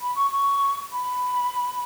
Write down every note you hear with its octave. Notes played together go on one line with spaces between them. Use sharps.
B5
C#6
C#6
B5